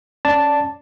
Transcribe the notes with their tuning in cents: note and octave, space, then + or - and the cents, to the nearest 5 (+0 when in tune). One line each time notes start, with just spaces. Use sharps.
C#4 +0 D5 -10 A5 +0